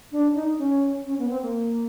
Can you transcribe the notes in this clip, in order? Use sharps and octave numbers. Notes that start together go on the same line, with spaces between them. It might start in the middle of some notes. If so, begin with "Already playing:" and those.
D4
D#4
C#4
C#4
B3
C4
A#3